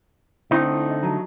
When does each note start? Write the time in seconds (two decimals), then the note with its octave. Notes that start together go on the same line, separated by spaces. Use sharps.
0.51 D3 A3 C4 D#4 E4 B5
0.90 D#5
1.03 F#3 G4 A5 A#5